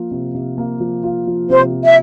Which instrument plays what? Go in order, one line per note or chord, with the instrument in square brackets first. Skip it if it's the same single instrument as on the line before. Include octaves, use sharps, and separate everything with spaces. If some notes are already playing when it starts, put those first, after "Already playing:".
Already playing: [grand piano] F3 A#3 F4
C3
C3
A#3
F3
F4
F3
[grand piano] C3 [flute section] C5
[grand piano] F3
[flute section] E5